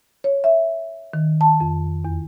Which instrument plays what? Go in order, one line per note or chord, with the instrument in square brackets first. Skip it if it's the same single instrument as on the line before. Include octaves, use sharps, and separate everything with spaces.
[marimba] C#5
E5
D#3
A5
F2
E2